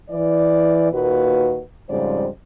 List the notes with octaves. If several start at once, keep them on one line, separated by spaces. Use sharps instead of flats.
E3 D5
D#2 A#2 F#4 B4
F2 G#2 C#3 G3 C5 D5